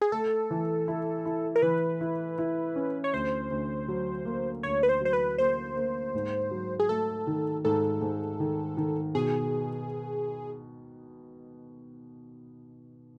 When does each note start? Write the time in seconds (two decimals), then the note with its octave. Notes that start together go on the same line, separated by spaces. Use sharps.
0.01 G#4
0.12 A3 A4
0.51 E3
0.88 E4
1.26 E4
1.56 A#4
1.62 E3 B4
2.01 E4
2.39 E4
2.76 C#4
3.04 C#5
3.13 D2 C5
3.51 D2
3.88 F#3
4.25 A#3
4.63 D2 C#5
4.83 B4
4.89 C5
5.01 F#3 C5
5.13 B4
5.38 A#3 C5
5.76 A#3
6.14 G#2
6.51 F#3
6.80 G#4
6.89 A3 A4
7.27 D#3
7.65 G#2 A4
8.01 G#2
8.40 D#3
8.77 D#3
9.15 B2 G#4